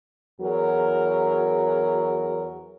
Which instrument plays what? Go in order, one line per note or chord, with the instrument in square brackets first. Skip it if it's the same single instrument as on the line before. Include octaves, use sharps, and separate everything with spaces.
[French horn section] E2 F#3 F#4 G#4 A#4